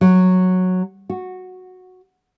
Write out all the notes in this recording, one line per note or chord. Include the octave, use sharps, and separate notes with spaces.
F#3
F#4